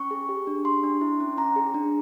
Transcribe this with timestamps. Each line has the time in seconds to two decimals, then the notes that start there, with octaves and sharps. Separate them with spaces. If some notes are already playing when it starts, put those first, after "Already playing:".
Already playing: C#4 C#6
0.11 G#4
0.29 G4
0.47 D4
0.65 G4 C6
0.84 D4
1.01 E4
1.20 C#4
1.38 C#4 A#5
1.56 G#4
1.74 D4